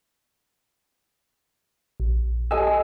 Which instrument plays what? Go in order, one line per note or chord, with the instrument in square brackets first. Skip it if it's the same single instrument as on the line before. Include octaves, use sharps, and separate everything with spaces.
[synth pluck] A#1
[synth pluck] G4 D#5 E6 [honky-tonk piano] A4 G#5 A5